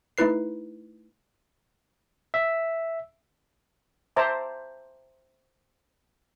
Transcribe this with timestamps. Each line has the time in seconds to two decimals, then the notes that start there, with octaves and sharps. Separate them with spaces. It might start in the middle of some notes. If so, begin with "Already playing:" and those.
0.18 A3 D#4 E4 B4 C7
2.34 E5
4.16 C5 E5 A5 A#5 D6